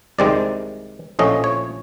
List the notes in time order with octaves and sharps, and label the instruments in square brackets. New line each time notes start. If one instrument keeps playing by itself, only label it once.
[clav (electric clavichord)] C2 C3 D#3 G#3 C4 D5
A#1 A2 F3 A3 C#4 D#5
C#5